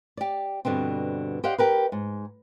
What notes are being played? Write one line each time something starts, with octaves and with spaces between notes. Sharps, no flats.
G4 D5
G2 B2 D3 B3 C4
G4 C5 D5 D#5 F5 F#5
G4 A#4 B4
G#2